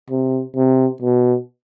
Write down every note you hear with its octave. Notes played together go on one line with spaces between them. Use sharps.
C3
C3
B2